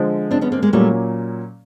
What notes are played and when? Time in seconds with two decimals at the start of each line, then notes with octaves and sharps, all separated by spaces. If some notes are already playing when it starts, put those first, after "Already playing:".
Already playing: D3 F3 G#3
0.31 C4 D4
0.41 B3 C#4
0.52 A#3 C4
0.62 G#3 A#3
0.73 A#2 F#3 G3 A3 A#3 C#4